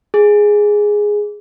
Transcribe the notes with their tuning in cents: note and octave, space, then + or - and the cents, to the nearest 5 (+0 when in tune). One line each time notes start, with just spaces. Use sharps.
G#4 +0